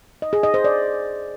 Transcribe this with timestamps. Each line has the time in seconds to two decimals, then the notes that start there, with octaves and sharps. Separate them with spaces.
0.22 D#5
0.33 G#4
0.43 D#5
0.54 C5
0.64 D5